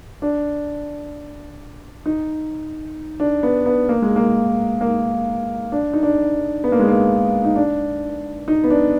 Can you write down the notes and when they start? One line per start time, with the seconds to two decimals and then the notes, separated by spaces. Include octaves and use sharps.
0.22 D4
2.06 D#4
3.20 D4
3.43 B3
3.66 B3
3.89 A#3
4.02 G#3
4.16 A#3
4.81 A#3
5.72 D4
5.93 D#4
6.03 D4
6.64 B3
6.72 A#3
6.79 G#3
6.88 A#3
7.45 D#4
7.56 D4
8.48 D#4
8.64 B3
8.70 D4